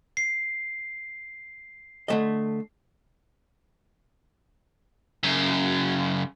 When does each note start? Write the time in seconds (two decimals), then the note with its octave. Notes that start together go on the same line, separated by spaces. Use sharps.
0.17 C7
2.08 D3 A3 D#5
5.23 F#2 C#3